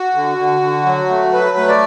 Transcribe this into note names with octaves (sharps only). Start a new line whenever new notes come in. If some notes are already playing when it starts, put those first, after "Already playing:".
Already playing: F#4
D3
D3
D3
F#3
A3
F#3 B4
A3
D5